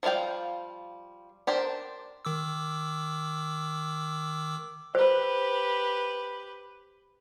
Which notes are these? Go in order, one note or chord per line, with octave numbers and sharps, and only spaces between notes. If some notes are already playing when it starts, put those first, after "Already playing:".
F3 G3 F4 F5 G5
D4 G4 A#4 C5
D#3 D6 E6
G4 B4 C5